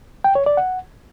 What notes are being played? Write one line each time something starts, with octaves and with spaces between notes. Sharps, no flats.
G5
C#5
D5
F#5